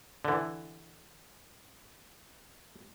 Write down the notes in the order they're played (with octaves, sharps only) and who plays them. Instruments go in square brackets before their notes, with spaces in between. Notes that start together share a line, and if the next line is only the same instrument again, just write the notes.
[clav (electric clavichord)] D3 E3